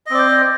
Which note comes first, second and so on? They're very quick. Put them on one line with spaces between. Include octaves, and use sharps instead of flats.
D#5 C4 D5 C5